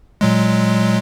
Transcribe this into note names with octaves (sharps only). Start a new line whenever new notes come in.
A#2 F#3 G#3